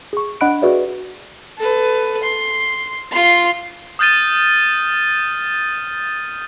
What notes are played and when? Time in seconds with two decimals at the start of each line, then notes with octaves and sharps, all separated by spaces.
0.13 G#4 C#6
0.41 D4 D#5 F#5 B5 F#6 D7
0.62 F#4 G#4 B4 D5 E5
1.57 A4 B4
2.23 C6
3.11 F4 C6
3.99 D#6 F6 G6 A6 D#7 G7